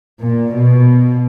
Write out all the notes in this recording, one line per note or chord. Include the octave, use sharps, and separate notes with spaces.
A#2
B2